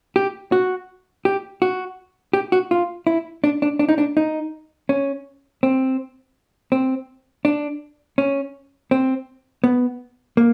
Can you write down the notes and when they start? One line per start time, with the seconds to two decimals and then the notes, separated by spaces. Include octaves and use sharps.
0.16 G4
0.52 F#4
1.25 G4
1.62 F#4
2.33 G4
2.52 F#4
2.71 F4
3.07 E4
3.44 D4
3.62 D4
3.79 D4
3.89 D#4
3.98 D4
4.17 D#4
4.89 C#4
5.63 C4
6.72 C4
7.45 D4
8.18 C#4
8.91 C4
9.64 B3
10.37 A#3